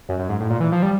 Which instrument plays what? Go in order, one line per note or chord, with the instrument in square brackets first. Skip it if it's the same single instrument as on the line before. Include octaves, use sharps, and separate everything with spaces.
[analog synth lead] F#2
F#2
G#2
A2
A#2
E3
F3
G3